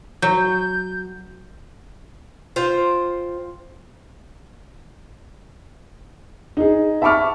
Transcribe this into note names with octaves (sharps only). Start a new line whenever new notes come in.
F#3 G6
F4 C5 G5
D#4 G#4
E5 A5 B5 C#6 D6 F6